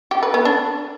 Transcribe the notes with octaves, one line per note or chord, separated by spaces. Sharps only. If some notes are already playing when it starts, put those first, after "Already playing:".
G4
B4
B3
D4